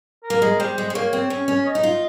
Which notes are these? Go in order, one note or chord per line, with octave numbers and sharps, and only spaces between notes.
A#4
A#3
G#3
G3 C5
G#3
G#3
A#3 C#5
C4
C#4
C#4
D#5
D#4
F4